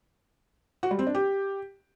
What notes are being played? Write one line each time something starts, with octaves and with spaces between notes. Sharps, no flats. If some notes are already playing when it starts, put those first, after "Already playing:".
F#4
G3
C4
D4
G4